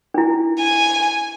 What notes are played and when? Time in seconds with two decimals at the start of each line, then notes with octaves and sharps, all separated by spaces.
0.14 D4 E4
0.60 G#5